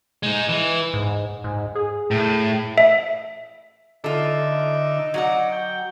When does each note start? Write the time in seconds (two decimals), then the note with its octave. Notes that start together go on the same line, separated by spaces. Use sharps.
0.23 G#3 D#4
0.49 E3
0.94 G#2
1.44 G#2
1.75 G#4
2.11 A2
2.78 E5
4.04 D3 D#4 F4 A4 E5 D6
5.14 F#3 F#4 D5 F#5
5.52 G5